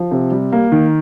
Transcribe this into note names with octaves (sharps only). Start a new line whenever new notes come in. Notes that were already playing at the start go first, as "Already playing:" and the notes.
Already playing: F3
C3
G3
A#3
D#3